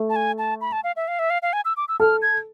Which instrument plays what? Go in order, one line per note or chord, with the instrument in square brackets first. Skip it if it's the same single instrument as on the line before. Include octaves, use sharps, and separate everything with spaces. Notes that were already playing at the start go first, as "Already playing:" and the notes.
Already playing: [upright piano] A3
[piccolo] A5
G#5
A5
B5
A5
F5
E5
F5
E5
F5
F5
G#5
E6
D6
E6
[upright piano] A4 [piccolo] F6
[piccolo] G#6